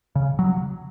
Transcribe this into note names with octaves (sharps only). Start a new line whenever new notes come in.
C#3
F#3